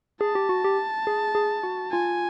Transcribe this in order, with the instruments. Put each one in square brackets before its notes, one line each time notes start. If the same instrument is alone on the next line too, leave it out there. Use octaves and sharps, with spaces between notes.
[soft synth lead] G#4 [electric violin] A5
[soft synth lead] G4
F#4
G4
G#4
G#4
F#4
[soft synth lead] F4 [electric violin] G#5